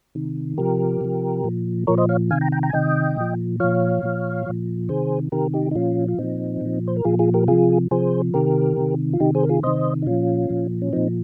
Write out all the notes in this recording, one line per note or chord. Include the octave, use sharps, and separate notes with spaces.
C3 D#3
C3 F3 G4 A#4
C3 F3
A#2 F3
A#2 F3 A#4 C#5
C5 D#5
C#5 F5
C3 D#3 F5 G#5
G5 A#5
G5 A#5
G5 A#5
G#5
C3 D#3 D#5 G5
A#2 F3
A#2 F3 C#5 F5
A#2 F3
A#2 F3
C3 D#3 G#4 C5
C3 D#3 G4 A#4
D#4 G4
D#4
A#2 F3 C#4 F4
F4
A#2 F3 C4 D#4
A#2 F3
C5
A#4
A#2 F3 F4 G#4
F4 G#4
G4 A#4
C3 F3 F4 G#4
C3 F3 G#4 C5
C3 D#3 G4 A#4
C3 D#3
F4
C3 D#3 D#4 G4
G#4 C5
A#4
F4 G#4
C3 D#3 C5 D#5
D#4
A#2 F3 C#4 F4
A#2 F3
C#4
A#2 F3 C4 D#4